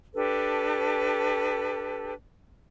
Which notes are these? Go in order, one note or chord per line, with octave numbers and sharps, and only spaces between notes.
D4 G4 A4 B4